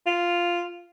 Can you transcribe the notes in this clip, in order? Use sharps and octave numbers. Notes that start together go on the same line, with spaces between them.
F4